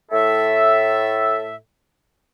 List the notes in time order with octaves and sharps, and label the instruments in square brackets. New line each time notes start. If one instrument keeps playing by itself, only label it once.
[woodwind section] A2 A4 E5